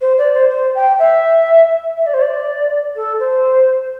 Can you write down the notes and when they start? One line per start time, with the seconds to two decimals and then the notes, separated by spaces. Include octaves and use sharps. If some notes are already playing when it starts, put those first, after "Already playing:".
0.01 C5
0.18 D5
0.33 C5
0.49 C5
0.75 G5
0.98 E5
1.96 E5
2.06 D5
2.13 C5
2.21 D5
2.95 A4
3.19 C5